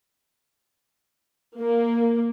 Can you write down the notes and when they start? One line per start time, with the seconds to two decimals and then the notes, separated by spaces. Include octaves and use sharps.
1.59 A#3